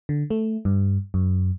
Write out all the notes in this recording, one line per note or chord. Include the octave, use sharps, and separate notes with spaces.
D3
A3
G2
F#2